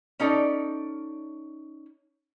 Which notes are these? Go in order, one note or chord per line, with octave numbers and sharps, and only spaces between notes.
C#4 D#4 A4 D5